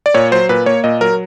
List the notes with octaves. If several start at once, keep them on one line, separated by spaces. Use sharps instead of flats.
D5
A#2 C#5
F#3 C5
A#2 B4
A#3 C#5
A#2 D#5
F#3 A#4